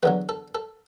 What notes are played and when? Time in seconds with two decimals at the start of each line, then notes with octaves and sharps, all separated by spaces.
0.03 E2 D3 F#3 B4
0.29 A4
0.55 A4